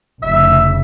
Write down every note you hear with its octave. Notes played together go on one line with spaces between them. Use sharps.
F1 C#3 E5